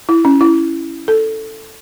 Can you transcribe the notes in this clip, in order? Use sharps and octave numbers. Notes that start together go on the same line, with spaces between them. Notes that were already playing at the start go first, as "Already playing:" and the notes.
E4
C#4
E4
A4